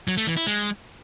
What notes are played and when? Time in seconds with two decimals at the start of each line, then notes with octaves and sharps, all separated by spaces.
0.08 F#3
0.17 A3
0.27 E3
0.37 E4
0.46 G#3